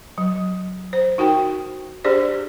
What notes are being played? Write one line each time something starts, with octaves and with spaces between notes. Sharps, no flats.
F#3
C5
D#4 F#4 A#4 G5
D4 G4 G#4 C5 D5